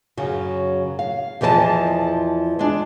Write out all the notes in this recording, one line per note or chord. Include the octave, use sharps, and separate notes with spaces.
F#2 C#3 F#3
F5
E2 E3 F3 A#4 D#5 A5
G#3 D4